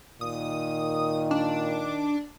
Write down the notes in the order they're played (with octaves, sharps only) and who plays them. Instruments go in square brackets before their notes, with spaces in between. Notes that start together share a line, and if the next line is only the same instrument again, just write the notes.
[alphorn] A#2 [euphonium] D#3 [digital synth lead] D#6
[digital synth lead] D4